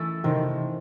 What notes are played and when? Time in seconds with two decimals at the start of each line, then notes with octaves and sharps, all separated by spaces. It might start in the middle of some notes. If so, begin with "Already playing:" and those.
Already playing: E3 A3 C#4 E4 A4
0.24 C3 D#3